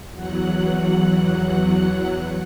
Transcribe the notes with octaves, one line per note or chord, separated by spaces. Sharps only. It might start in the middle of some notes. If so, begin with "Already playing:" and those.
E2 F#3 F#5 F#6